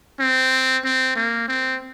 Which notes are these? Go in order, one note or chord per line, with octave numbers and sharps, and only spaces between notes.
C4
C4
A#3
C4